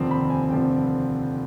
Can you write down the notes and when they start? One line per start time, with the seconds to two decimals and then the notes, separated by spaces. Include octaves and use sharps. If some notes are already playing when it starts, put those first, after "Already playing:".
Already playing: F1 D#2 D3 F3 C4
0.11 B5
0.30 G#5
0.50 F1 D3 F3 C4 G5